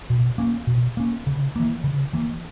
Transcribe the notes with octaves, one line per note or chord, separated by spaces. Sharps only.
B2
A#3 C#4
B2
A#3 C#4
C#3
E3 A#3
C#3
E3 A#3